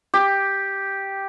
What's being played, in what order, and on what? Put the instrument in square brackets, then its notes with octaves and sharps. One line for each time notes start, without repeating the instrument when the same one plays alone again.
[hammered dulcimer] G4